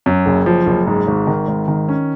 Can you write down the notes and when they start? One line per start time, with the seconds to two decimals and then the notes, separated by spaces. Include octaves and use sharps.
0.06 F#2
0.26 F#1
0.46 F3
0.66 F#1
0.87 G#2
1.07 G#1
1.27 D#3
1.48 G#1
1.68 D#3
1.89 C#4